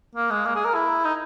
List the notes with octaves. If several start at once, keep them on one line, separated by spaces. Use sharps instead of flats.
A#3
G#3
A#3
G#4
A#4
E4
D#4